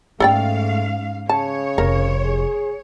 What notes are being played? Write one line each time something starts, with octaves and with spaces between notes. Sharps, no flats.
G#2 A3 C#4 A4 D5 F5 G5
C#3 C#5 A5
F1 A#4
G#4